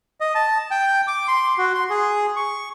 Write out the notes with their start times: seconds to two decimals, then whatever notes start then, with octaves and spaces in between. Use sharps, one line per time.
0.20 D#5
0.35 A5
0.71 G5
1.07 D6
1.28 C6
1.58 F#4
1.75 C6
1.90 G#4
2.36 C#6